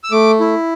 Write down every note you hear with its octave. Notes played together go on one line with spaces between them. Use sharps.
E6
A3 D6
E4